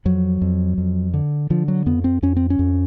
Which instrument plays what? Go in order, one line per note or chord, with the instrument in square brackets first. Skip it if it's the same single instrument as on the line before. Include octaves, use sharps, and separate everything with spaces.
[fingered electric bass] F2 F#3
F2
F2
D3
D3 F3
F#3
F2 B3
C4
F2 C#4
C4
C#4
F2